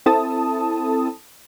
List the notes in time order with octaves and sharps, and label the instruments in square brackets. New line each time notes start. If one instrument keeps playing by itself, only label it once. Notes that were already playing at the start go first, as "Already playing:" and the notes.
[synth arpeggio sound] C4 E4 A4 A5 D#6